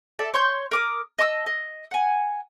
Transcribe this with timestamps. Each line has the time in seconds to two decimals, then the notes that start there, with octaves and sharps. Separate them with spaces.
0.19 A4 D5 E5
0.34 C#5 C6 C#6 G6
0.71 A#4 D6 D#6
1.19 D#5 A5 D6 E6
1.46 D#5
1.91 F#5 G#5